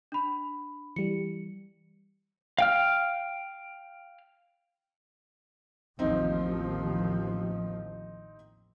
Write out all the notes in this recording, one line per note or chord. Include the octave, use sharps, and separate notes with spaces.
D4 B5
E3 G3 C#7
F5 G5 F6
A1 D#2 F3 C4 D#4